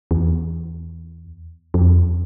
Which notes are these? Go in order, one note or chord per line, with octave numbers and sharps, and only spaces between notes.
E2
F2